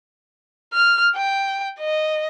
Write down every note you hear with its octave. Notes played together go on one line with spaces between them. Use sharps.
F6
G5
D#5